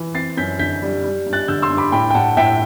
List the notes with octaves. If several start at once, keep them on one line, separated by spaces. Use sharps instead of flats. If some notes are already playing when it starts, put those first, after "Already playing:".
Already playing: E3
C4 A6 C7
F#2 G6 B6
D3 G6 B6
G3
G3
G2
F#6 A6
D3 E6 G6
C6 E6
G2
B5 D6
A2 G5 B5
G5
A2 F#5 A5
A2 E5 G5